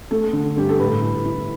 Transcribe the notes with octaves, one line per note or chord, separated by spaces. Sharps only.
A3 A4
D3
G2 G4
A4
A2 B4
E4
E4